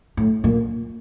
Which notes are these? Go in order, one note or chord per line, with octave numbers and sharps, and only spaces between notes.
A2
A#2